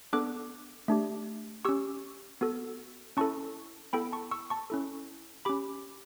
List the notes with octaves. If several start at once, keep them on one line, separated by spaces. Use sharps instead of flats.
B3 D4 A4 D6 F#6
A3 D4 G4
C#4 G4 C#6 E6
B3 F#4 A4
C#4 E4 A4 A5 C#6
B3 E4 A4 G5 B5
A5 C#6
C#6 E6
A5 C#6
C#4 E4 A4
C#4 G4 B5 D6